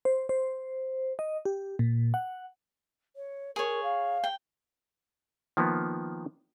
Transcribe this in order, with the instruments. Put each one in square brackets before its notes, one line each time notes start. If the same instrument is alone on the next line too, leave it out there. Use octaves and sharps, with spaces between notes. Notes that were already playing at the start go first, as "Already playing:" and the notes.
[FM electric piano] C5
C5
D#5
G4
A#2
F#5
[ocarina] C#5
[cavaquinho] G#4 C#5 [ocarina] A#4
[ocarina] F5
[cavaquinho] G5
[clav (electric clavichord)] D#3 F3 A#3 B3